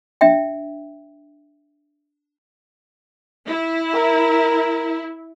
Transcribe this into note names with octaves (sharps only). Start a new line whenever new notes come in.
D4 E5 G5
E4
A#4